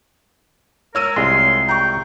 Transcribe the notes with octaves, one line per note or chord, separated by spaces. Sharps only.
A#4 C#5 E6 D#7
C2 G#3 F4 C6
G5 A#5 C#6